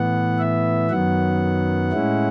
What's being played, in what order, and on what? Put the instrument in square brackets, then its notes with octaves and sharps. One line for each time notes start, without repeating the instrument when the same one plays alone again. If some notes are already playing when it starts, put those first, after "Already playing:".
Already playing: [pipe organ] A2 E3 B3 F#5
E5
F#2 D#3 F#3 B3 F#5
A2 G#3 C#4 E4